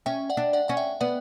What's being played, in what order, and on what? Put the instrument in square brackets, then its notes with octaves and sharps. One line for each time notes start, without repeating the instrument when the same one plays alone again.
[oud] C#4 [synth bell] E5 G5
[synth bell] D5 F#5
[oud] D4
[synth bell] D5 F#5
[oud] C#4 [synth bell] F#5
[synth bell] E5 G5
[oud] B3 [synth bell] D5 F#5